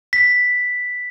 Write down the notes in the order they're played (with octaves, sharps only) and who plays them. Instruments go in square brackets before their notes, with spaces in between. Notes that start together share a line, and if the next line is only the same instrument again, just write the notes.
[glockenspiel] B6